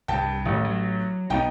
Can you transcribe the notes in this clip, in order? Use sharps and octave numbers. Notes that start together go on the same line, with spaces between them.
C2 G2 G5 A5
D1 A1 D#3
F#3
B1 G#3 B3 D#4 G5